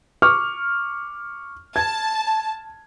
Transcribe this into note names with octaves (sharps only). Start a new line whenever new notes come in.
C#6 D6 F6
A5 G#6